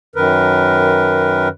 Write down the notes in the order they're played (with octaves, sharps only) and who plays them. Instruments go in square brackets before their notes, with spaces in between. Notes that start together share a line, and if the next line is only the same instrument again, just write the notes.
[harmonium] F#2 D#3 A#4 B4